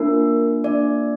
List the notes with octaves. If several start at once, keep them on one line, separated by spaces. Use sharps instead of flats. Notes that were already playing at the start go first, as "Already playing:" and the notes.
Already playing: A#3 D4 F4 A#4
A#3 D4 F4 D5